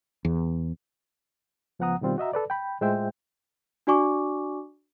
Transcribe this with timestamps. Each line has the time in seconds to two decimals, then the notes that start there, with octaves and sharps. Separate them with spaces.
0.25 E2
1.79 C#2 F3 B3 F#5 A#5 D#6
2.01 B2 D#3 G3 C4 F4
2.18 F#4 D#5 E5 A#5
2.33 A4 B4 D5
2.50 G5 B5
2.81 A2 G#3 F4 C5 E5 G5
3.87 D4 F#4 D5 G#5 C#6 D6